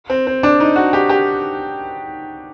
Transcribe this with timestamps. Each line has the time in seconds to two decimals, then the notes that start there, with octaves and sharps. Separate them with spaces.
0.10 C4
0.27 C4
0.43 D4
0.60 D#4
0.76 F#4
0.93 G4
1.10 G4